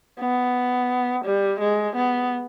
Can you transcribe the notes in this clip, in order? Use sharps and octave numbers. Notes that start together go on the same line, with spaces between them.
B3
G3
G#3
B3